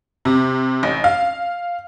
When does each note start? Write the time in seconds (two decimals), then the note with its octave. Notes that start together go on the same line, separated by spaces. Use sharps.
0.25 C3
0.83 A1
1.04 F5